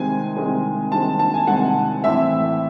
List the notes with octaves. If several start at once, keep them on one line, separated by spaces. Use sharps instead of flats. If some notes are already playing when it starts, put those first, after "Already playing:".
Already playing: C2 C3 D#3 G#3 C4 G#5
C2 C3 D#3 G#3 C4
C2 C3 D#3 G#3 C4 A5
A5
G#5
C2 C3 D#3 G#3 C4 F#5
A2 E3 C4 E5